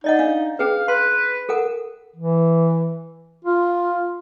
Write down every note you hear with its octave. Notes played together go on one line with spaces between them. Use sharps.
D#4 D5 D#5 F#5
D4 F5
C#4 G#4 B4 F5
B4 C6
A4 A#4 F#5
E3
F4